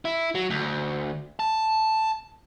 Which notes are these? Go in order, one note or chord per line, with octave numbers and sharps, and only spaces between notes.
E4
F#3
D2
A5